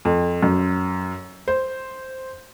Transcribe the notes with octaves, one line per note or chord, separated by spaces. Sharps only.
F2
F#2
C5